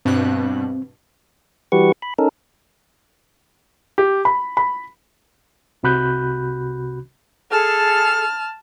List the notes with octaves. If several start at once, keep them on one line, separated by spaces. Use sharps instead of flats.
G2 B2 C4 F#6
E3 G3 F#4 G4 B4 C#6
B5
C#4 D#4 A4 A#4
G4
B5
B5
C2 C3 F#4 B5 F#6 G6
G#4 A4 A5 F6